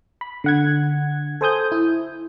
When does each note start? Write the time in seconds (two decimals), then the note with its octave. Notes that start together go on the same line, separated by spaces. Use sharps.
0.21 B5
0.44 D3 F#5 G#6
1.41 A4 C5 G#5 D#6 G6
1.72 E4